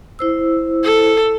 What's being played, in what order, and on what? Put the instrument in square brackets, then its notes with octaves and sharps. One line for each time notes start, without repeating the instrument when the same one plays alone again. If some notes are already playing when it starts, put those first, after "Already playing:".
[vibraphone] E4 C5 E6
[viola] A4